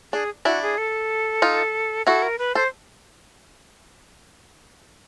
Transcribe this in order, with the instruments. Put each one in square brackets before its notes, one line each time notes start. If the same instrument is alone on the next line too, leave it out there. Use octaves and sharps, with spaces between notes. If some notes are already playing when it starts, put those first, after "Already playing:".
[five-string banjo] D4 [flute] G#4
[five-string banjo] D4 E4 [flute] F#4
[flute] G#4
A4
[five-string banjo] D#4 F4
[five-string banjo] E4 F#4 [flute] A4
[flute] A#4
B4
[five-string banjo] A4 [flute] C5